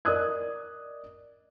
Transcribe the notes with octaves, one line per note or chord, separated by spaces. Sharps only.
A#4 D5 D#5 D#6 F#6 G#6